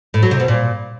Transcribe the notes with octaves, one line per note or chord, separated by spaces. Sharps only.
A2
F#3
C3
B2
A#2